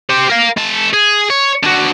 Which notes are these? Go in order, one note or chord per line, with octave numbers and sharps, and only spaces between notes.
G4 C5
A#4 F5
G#3 A5
G#4
C#5
D3 F#4